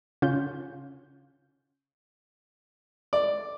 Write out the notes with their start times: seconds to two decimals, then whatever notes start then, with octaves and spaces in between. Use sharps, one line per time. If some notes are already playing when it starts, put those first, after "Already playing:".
0.22 C#3 C#4 F4 G6
3.13 D5